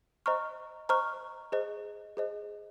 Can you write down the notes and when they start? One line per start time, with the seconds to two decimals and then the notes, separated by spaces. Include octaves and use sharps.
0.26 C5 D#5 A#5 C#6 F6
0.89 C5 D#5 A#5 C#6 F6
1.52 G#4 C5 D#5
2.17 G#4 C5 D#5